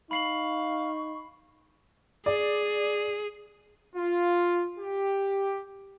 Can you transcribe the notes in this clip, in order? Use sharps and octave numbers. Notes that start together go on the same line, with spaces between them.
D#4 F5 B5 C#6 C7 F#7
G#4 D5
F4
G4